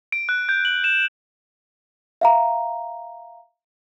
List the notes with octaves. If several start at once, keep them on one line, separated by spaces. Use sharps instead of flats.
D7
F#6
G6
F#7
E7
E5 F5 A#5